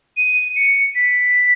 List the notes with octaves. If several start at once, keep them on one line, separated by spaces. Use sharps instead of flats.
D#7
C#7
B6